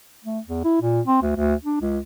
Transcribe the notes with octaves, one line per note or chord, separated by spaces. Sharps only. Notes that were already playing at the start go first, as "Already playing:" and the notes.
A3
E2
E4
A#2
C4
D2
D2
D4
C#2